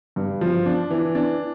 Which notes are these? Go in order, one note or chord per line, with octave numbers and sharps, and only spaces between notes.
G2
F3
D4
E3
D4